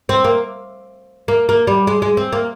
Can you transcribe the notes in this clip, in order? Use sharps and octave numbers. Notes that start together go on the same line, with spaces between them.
C4
A#3
A#3
A#3
G3
G#3
G#3
C4
A#3